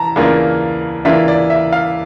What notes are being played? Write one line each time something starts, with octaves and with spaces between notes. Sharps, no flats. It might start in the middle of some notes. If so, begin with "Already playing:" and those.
Already playing: E3 A5 A#5
C#3 E3 A#3 D4 F4
C#3 E3 A#3 D4 F4 E5
D5
E5
F5